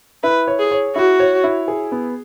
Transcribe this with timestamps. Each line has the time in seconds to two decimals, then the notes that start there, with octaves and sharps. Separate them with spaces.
0.23 E4 B4
0.47 C#5
0.59 G#4
0.71 C#5
0.96 E4 F#4
1.20 C#5
1.44 E4
1.68 G#4
1.92 B3